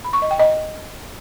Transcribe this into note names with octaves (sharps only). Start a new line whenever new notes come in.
B5
C#6
D#5
G5
D#5